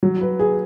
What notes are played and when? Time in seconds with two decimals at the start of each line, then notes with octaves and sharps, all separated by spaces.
0.03 F#3
0.21 B4
0.39 G#4